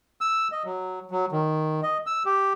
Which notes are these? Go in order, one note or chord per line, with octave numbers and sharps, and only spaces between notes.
E6
D#5
F#3
F#3
D#3
D#5
E6
G4